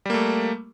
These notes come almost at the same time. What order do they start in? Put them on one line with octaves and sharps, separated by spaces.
G3 A#3 A3